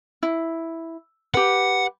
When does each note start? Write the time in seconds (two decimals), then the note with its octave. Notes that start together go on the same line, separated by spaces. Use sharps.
0.23 E4
1.34 G4 B4 F#5